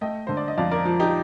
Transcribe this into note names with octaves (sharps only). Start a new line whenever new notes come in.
A3 D#5 G5
D3 C5
D5
D#5
F2 D5 F5
A#4 D5
F3
D#4 G4